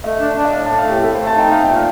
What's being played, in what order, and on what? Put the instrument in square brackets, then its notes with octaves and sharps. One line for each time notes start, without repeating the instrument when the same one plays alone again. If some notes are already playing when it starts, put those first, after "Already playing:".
[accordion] A3 [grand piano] D#5
[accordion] D4
D4
[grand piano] D#5
[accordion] A2 [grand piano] F5
[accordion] A3 [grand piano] A5
[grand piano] F5
[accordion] A2 [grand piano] G4
[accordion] A3 [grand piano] A4
[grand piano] C5
[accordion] A3
[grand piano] A5
[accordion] D#4 [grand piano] G5
[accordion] A3 [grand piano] F5
[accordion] A#2 [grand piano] G5
[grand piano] F5